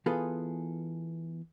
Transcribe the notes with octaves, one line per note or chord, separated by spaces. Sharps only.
E3 B3 F4 G#4 A4 B4